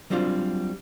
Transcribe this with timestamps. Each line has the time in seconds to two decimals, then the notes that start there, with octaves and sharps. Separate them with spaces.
0.10 F#3 G3 C4 D4 D#4 F4